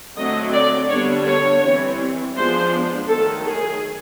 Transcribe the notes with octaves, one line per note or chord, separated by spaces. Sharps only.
D3 F#3 A3 C4 D#5
D5
D3 G3 B3 D4 C#5
C#5
E3 G3 C4
F3 G#3 B3 D4 C5
D#3 F#3 A3 A4
G#4